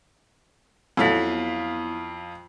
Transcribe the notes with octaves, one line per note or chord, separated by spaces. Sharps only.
F2 F#3 B3 E4 F4 A4 C#5 B6